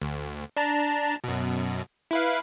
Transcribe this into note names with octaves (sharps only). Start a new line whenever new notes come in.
D2
D4 A5 A#5
F#2 B2
E4 B4 F5